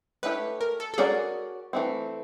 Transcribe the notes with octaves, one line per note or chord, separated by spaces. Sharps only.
A3 C#4 E4 G4 B4
A#4
A4
A4
C#4 F#4 G#4 A#4 D5
E3 A3 C4